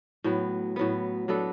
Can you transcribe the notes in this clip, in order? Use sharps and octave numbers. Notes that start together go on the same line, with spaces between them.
A2 F#3 B3
A2 F#3 B3
F#3 B3 D4 A4